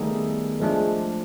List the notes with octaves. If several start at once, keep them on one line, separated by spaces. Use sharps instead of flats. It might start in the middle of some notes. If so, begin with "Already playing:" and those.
Already playing: D#3 G3 A3 B3 D#4 G#4
F3 G#3 A3 D4